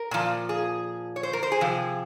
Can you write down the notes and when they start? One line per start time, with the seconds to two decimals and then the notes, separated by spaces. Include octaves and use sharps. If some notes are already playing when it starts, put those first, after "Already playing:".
Already playing: A#4
0.11 A#2 F3
0.49 G#4
1.16 C#5
1.23 C5
1.33 A#4
1.43 C5
1.52 G#4
1.61 C3 F3